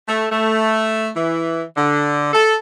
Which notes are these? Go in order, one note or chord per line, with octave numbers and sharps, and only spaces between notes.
A3
A3
E3
D3
A4